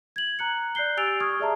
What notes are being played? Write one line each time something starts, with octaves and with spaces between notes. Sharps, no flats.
G#6 F#7
A#5 F#6 C#7
D5 F#6 G6 C7 G7
G4 G#5 E6 A6 D7 F7
C#6 D#6 F6 G#6
G#4 D5 E5 A5 A#5